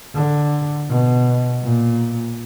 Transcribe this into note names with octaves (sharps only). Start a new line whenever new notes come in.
D3
B2
A#2